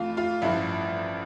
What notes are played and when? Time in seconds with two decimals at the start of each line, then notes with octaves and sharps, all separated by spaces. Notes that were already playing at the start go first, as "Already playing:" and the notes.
Already playing: F2 E3 A3 F4 F5
0.17 F4 F5
0.42 A1 G2 F3 E4 E5